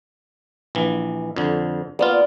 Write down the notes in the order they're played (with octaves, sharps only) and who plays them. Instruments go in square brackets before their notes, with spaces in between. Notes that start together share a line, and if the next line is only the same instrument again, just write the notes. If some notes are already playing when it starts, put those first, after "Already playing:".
[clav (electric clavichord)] A#1 E3
F2 D3
[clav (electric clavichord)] A#3 B3 F4 [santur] D5